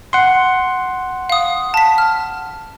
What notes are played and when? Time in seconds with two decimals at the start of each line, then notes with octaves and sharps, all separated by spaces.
0.13 F#5 C6
1.30 F5 D#6
1.74 A5 B6
1.98 F6